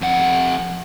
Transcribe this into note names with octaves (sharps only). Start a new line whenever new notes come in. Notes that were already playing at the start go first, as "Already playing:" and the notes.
F2 F#5